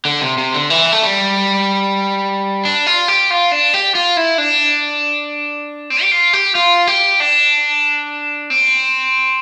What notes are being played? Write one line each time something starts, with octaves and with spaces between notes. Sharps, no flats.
D3
C3
C3
D3
E3
A3
G3
D4
F4
G4
F4
D4
G4
F4
E4
D4
C4
G4
F4
G4
F4
G4
D4
C4